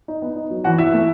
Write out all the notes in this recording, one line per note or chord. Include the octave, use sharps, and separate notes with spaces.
D#4
B3
D#4
F#3
E3 F#4 F#5
E4 E5
A3